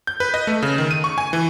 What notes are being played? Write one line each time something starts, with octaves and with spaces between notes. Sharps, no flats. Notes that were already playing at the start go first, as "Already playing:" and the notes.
G6
B4
D#5
A3
C#3
D#3
D#7
C#6
G#5
E3